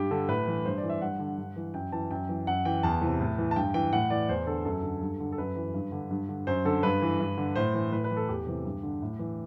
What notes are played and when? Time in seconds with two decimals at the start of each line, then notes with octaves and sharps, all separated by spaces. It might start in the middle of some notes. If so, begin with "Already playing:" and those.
Already playing: G2 G4
0.11 D3 A4
0.28 A2 B4
0.48 E3
0.65 G2 C5
0.78 D5
0.83 E3
0.90 E5
1.01 G2 F#5
1.19 D3
1.38 G2
1.56 E3
1.74 F#2 G5
1.92 E3 A5
2.11 F#2 G5
2.29 E3
2.47 F#2 F#5
2.65 E3 G5
2.83 E2 A5
3.02 C3 E3
3.20 A2
3.38 E3
3.51 A5
3.56 G2 G5
3.74 E3 G5
3.93 A2 F#5
4.10 E3 D5
4.29 E2 C5
4.47 D3 A4
4.65 F#2 A4
4.83 D3
5.01 G2
5.20 D3
5.32 A4
5.38 F#2 B4
5.56 E3
5.74 G2
5.92 D3
6.11 G2
6.29 D3
6.47 F#2 C5
6.65 D3 A4
6.83 G2 B4
7.02 E3
7.20 G2
7.38 D3
7.56 A2 C5
7.74 E3
7.92 A2 B4
8.04 B4
8.11 E3
8.17 A4
8.29 E2 G4
8.47 C3 E3
8.65 G2
8.83 D3
9.02 A2
9.19 E3